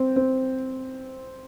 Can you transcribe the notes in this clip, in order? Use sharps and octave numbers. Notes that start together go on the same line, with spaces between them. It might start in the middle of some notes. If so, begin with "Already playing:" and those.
Already playing: C4
C4